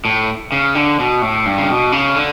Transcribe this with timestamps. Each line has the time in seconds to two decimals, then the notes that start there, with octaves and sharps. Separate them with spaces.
0.05 A2
0.52 C#3
0.75 D3
0.99 B2
1.22 A2
1.46 G2
1.58 C#3
1.70 B2
1.92 C#3
2.16 D3